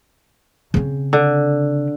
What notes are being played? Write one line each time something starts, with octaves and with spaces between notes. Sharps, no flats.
C#3 C4
D3